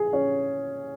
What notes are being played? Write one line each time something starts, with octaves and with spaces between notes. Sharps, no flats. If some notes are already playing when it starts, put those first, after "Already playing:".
Already playing: G#4
C#4